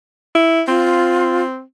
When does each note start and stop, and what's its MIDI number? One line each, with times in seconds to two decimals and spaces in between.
0.35 0.63 64
0.68 1.62 60
0.68 1.42 65